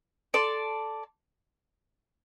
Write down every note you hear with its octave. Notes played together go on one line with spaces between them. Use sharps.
A4 D5 A5 C6